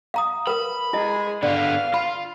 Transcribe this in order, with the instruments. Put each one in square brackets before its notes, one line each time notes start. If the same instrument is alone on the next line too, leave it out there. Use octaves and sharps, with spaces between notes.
[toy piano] F5 A#5 D#6
[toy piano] A#4 B4 [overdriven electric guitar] B5
[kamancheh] G#3 G#4 [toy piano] E4 D#5
[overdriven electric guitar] D3 B3 [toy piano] D5 [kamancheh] F5
[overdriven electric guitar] F4 [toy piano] B5